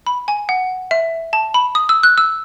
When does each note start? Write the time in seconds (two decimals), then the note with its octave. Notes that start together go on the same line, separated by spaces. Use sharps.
0.07 B5
0.28 G#5
0.49 F#5
0.91 E5
1.33 A5
1.54 B5
1.75 D#6
1.89 E6
2.03 F#6
2.18 E6